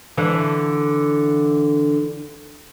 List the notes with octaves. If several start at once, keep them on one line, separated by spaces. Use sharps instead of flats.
D3 E3